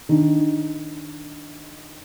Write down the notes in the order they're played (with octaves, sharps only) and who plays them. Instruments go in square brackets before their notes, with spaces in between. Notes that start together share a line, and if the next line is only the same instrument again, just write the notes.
[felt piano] D#3 D4